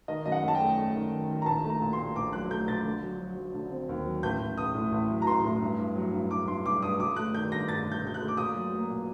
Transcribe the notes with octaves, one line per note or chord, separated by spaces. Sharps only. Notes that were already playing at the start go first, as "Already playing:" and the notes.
D#3 D#5
F#2 D#5
F#5
F#2 A5
G5
A3
A3
D#3
D#3
D#3
A#5
A#1 A5
A3
A#5
A#2
C6
A#2
A#1 D6
F#3 F#6
A3 G6
A#1 A6
D3
F#3
F#3
F#3
D3
C4
D#2
F#3
A1 G6
A1
A1 D#6
A2
A1
F#3
A#5
A1 C6
A2
G2
G2
F#3
G2
G2 D6
G2 C6
G2 D6
G2 D#6
G1 D6
A3 F#6
D#3 G6
G2 A#6
G1 A6
G2
G6
G1 G6
F#6
A3
D6
A#2 D#6
F#3
A#3
A#2